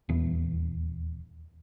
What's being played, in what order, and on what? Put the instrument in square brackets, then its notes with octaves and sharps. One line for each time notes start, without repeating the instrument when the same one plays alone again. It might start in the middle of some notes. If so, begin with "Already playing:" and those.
[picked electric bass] D#1 E2 B3